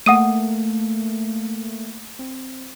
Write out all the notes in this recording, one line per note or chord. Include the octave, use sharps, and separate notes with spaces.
A3 A#3 F#5 D#6 D#7
C4